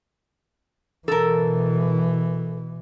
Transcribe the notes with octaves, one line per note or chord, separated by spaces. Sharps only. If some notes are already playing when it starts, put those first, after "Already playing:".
B2 E3 A4 A#4